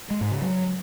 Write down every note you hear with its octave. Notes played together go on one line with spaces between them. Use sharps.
G#3
G#2
C#3
F#3